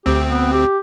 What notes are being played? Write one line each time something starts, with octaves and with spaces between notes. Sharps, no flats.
D2 C4 G4
B3
G4